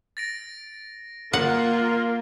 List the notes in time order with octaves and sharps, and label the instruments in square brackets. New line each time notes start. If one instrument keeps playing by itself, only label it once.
[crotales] A6 A#6 D7
[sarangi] A#3 [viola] F4 A#4 [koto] F#5